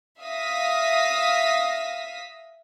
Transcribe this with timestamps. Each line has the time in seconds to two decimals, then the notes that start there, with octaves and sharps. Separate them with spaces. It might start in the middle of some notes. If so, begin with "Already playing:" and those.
0.21 E5 F5 D#6 A#6 B6